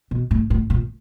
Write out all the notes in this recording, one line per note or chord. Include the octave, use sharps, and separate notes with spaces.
B2
A2
A2
A#2